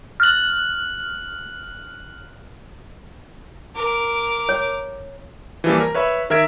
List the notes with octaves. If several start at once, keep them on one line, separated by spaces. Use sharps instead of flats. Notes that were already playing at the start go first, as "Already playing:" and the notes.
F6 F#6 F#7
A#4 D6
C#5
E3 F3 G3 A#3
A#4
B4 C#5 E5 B5
D#3 A#4 E5 G#6 D7